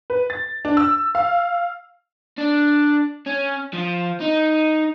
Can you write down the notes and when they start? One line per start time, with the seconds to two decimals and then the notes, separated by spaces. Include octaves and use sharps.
0.10 B4
0.30 A6
0.65 D4
0.77 E6
1.15 F5
2.38 D4
3.26 C#4
3.73 F3
4.21 D#4